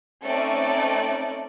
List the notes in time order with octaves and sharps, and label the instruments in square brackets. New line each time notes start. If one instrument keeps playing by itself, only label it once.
[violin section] A3 C4 C#4 D#4 A4 D5